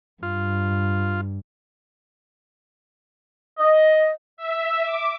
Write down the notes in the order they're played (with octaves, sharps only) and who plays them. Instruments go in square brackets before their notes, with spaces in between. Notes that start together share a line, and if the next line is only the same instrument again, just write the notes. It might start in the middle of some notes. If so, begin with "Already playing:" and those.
[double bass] G2 [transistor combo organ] F4
[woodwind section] D#5
[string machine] E5
D6